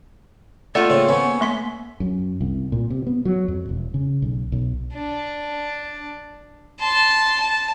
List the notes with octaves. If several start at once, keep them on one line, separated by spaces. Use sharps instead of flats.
A3 A#3 F4 D5 F#5
C#3 C4
B3 C#4 B4
A3 C6 B6
F#2
C2
A#2
C3
B3
F#3
F2
E1
C#3
B1
B1
D4
A5 C6
A5